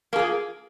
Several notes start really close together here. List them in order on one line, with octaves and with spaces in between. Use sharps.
A#3 G#4 F4